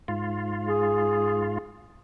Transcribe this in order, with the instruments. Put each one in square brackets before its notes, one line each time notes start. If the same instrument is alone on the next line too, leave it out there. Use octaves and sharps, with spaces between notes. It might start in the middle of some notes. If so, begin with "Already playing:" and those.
[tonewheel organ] G#2 F4
[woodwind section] G#4